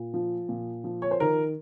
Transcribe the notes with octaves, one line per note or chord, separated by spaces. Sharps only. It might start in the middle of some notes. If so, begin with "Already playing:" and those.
Already playing: A#2
F3
A#2
F3
C#5
C5
D#3 A#4